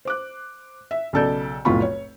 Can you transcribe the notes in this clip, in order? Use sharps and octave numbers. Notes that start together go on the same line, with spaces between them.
C5 D6 F#6
E5
B1 C#3 A4 D5 G6
F1 B1 A2 F4 B5 C#6
C#5